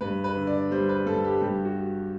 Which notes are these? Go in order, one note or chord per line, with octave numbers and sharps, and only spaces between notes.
G2 B4
B4
D3
D5
G3 C5
B4
G2 A4
G4
G2 G4
F#4